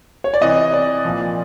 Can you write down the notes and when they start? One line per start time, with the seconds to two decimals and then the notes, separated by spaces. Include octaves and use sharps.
0.24 C#5
0.34 D5
0.41 C3 E3 D#5
0.74 D5
1.05 A#2 F3